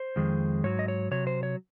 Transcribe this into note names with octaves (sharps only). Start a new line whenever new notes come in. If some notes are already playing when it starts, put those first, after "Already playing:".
Already playing: C5
F2 D#3 G#3
G#2 F#3 C#5
D#5
C#5
C3 F#3 C#5
C5
C#5